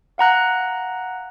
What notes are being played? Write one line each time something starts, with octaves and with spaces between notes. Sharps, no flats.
F5 F#5 A#5 F#6